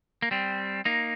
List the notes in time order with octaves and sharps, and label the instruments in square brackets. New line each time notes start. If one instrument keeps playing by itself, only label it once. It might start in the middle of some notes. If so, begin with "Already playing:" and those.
[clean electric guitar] A#3
G3 C4
A#3 D#4